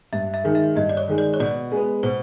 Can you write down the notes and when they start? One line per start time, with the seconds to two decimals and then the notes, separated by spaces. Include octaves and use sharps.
0.13 G2 E5
0.34 E5
0.44 D#3 G#3
0.55 E5
0.76 G2 D#5
0.89 D5
0.97 C#5
1.08 D#3 G#3
1.18 D5
1.34 C#5
1.40 B2 D5
1.72 G#3 B3
2.03 B2 C5